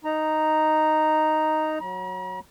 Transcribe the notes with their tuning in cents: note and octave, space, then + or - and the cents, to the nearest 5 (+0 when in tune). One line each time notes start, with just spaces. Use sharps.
D#4 +0 A#5 +0
F#3 -15 A#5 +45